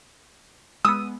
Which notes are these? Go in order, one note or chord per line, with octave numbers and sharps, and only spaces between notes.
G#3 B3 D#6 E6